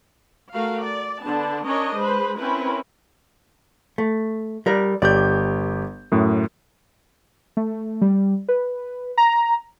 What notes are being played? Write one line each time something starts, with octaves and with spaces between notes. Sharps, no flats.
A3 F#4 A#4 F5
D5
D3 B3 D4 A5
C#4 D4 A#4 C#5 D#5
G#3 B4 C5
C4 C#4 E4 A#4 B4
A3
G3 A#4 D5
G1 G4 D5 G6
F#2 A2
A3
G3
B4
A#5